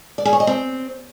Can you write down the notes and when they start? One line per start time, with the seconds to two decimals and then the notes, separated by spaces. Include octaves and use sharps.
0.18 D5
0.25 G#4
0.33 C#5
0.40 D#5
0.47 C4